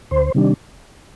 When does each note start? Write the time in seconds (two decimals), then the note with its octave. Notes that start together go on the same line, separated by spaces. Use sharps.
0.11 D2 C5
0.34 C3 D#3 G3 D4